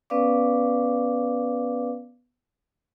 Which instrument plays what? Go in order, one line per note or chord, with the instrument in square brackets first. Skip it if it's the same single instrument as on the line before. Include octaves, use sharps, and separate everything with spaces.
[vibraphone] B3 C#4 B4 D5 F5 D6